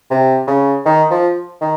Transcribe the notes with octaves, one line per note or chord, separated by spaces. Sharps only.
C3
C#3
D#3
F3
D#3